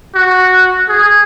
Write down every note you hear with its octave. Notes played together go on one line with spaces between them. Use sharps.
F#4
G#4